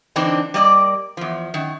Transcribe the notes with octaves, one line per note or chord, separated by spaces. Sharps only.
D3 E3 C4 D4 D#4
G3 A#3 D5 D#5
E2 F3
F#2 D#3